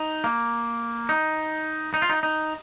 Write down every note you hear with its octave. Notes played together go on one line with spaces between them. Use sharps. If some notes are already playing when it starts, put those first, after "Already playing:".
Already playing: D#4
A#3
D#4
D#4
F4
D#4
D#4